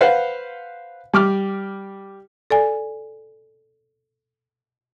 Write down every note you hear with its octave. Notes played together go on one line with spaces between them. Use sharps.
B4 C5 F5 F#5
G3 D6 F6
A4 D5 G#5